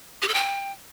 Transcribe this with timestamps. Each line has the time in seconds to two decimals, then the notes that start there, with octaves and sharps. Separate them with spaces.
0.22 G4
0.28 A4
0.34 G5